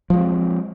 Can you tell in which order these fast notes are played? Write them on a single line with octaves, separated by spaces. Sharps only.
F3 G#3 C4